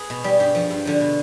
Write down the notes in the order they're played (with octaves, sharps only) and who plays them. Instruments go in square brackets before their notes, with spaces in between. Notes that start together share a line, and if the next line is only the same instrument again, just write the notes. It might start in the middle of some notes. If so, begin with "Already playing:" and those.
Already playing: [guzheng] G#4 B4
B2
G3
G2 G4
F3
G2
D3 F3
B2